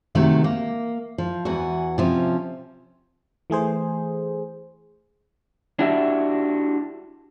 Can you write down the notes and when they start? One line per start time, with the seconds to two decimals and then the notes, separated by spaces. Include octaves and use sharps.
0.15 C3 D#3 F#3 A3
0.44 A#3
1.18 F3
1.45 E2 E3 F#4
1.98 C3 F3 C#4
3.50 E3 A3 G#4 C5
5.79 D4 E4 F#4 G4 E5